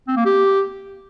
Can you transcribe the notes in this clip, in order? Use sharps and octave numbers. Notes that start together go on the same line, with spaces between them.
C4
A#3
G4